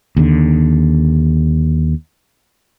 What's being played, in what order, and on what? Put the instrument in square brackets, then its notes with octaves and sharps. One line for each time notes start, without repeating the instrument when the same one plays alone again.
[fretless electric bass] D#2 D3